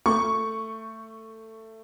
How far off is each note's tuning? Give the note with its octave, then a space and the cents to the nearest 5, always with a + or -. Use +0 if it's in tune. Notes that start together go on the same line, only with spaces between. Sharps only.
A3 +15 C#6 +0